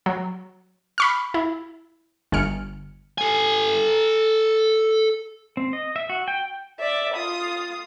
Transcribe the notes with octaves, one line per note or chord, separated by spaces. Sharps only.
F#3
B5 C#6 F6
E4
G1 G#5 F6 C#7
A4 G#5
C4
D#5
E5
F#4
G5
D5 E5
F4 D#6